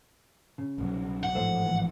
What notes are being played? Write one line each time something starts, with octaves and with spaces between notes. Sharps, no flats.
C#3
C2 B2 F#3
F#5
A1 G#2 F3 A4 C5 F5
E3